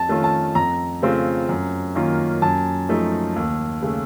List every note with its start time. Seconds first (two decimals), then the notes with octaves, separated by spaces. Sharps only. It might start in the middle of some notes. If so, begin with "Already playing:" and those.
Already playing: F2 A5
0.09 D#3 A3 C#4 F4
0.24 A5
0.55 F2 A#5
1.02 C#3 A3 C4 F4
1.49 F#2
1.95 D#3 A#3 C#4 F4
2.42 F#2 A5
2.89 F3 A3 D#4
3.36 D#2
3.82 C#3 A3